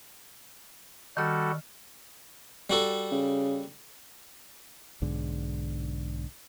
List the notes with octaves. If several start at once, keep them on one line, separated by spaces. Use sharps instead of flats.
D#3 G3 F#4 A4 F6
G3 F#4 A4
C#3
B1 G#2 D3